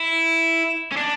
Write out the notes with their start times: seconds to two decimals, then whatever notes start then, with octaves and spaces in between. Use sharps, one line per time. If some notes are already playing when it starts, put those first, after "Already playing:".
Already playing: E4
0.92 C#4
0.97 D4